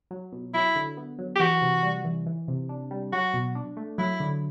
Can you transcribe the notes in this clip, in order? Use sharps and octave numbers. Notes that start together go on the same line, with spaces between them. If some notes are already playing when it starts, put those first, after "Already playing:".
F#3
B2
F#3 E4
D3
B3
F#3
G4
E3 F#4
C3
G3
E3
E3
C3
D4
G3
F#3 F#4
B2
D4
A3
F#3 E4
D3